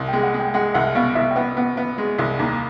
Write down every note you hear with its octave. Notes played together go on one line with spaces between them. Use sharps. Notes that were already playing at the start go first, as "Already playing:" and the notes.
Already playing: C2
G#3 G5
F#5
G#3
G5
G#3 F#5
C2 F#5
B2 F5
C2 E5
G5
B3 F#5
B3 F#5
B3
G#3
C2
D#2 G5